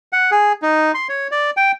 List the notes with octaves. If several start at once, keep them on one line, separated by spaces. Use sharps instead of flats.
F#5
G#4
D#4
C6
C#5
D5
G5